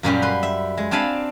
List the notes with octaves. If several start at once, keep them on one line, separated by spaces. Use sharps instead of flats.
F#2 A#2 G3 C#4
B4 C6
E5
G#3
C4 D4 F5 G#5 A5 B5